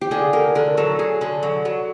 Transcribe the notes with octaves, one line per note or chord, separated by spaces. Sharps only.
G4
D3 G#4
D3 A#4
D3 A#4
F#3 A4
F#3 G#4
D3
F#3
F#3